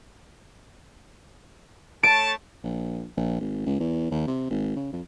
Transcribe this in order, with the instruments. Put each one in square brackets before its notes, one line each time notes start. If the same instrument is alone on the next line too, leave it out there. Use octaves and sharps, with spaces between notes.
[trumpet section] A3 C#5 A5 [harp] D7
[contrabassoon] A#1
A#1
G#1
C#2
E2
D#2
C3
G#1
C#3
F2